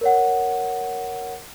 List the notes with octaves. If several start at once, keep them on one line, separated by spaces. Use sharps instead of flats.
A#4 C#5 F#5